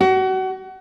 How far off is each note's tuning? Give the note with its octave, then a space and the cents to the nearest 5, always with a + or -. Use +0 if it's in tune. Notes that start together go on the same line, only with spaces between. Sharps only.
F#4 +30